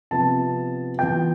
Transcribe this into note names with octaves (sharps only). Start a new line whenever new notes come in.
C3 F3 B3 A5
E3 B3 F4 G5